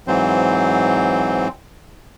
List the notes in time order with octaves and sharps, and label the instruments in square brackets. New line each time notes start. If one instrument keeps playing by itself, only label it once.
[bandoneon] G#2 E3 F#3 C4 C5